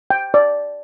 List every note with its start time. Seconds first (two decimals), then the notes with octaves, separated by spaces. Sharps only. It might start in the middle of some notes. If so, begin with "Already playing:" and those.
0.10 G5
0.34 D5